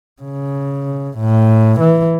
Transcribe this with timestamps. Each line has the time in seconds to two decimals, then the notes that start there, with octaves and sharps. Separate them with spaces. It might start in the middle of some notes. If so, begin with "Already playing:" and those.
0.22 C#3
1.19 A2
1.81 E3